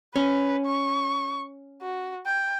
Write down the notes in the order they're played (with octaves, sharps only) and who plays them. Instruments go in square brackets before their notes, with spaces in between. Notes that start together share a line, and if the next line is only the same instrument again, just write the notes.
[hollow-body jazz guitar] C#4 [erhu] B4
[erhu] C#6
F#4
G5